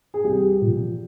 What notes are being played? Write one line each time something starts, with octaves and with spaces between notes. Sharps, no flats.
G#4
C2 G4
A#2 F3